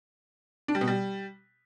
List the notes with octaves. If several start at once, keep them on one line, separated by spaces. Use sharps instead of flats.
D4
G3
B2
G3